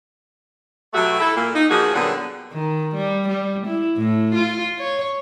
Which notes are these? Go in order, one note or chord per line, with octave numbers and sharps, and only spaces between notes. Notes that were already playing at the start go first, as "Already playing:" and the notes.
B2 F#3 A3 F#4 G4 E5
E4 A4
A#2 A#3
D#4
E2 F3 A#3 F#4 G#4
A#2 D3 F#3 G3 B3 G#4
D#3
G3
G3
E4
A2
F4
C#5